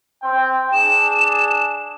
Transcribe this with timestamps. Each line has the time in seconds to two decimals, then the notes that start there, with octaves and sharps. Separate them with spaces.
0.23 C4 G5
0.73 D4 G#4 E7